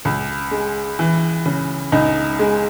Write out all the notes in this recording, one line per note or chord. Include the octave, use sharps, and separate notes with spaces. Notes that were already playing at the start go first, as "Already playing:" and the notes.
C#2
G#3
E3
C#3
C#2 D#4
G#3